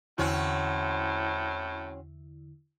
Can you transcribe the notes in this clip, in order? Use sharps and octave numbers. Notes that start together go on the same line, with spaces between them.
E2 A2 D3 C4 C#4 E4 F#4